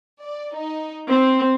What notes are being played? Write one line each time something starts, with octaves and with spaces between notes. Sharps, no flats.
D5
D#4
C4